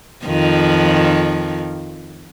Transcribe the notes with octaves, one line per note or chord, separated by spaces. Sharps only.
F2 D#3 F3